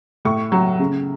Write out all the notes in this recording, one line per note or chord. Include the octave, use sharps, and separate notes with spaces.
A2 C#6
F#3
C#3